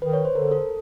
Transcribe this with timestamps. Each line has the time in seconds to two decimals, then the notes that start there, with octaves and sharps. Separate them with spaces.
0.02 D#3 B4
0.13 C#5
0.25 C5
0.35 D3 A#4
0.51 A4